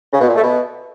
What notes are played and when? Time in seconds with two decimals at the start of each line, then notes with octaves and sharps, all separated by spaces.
0.13 C#3
0.21 B2
0.28 A#2
0.36 A3
0.43 B2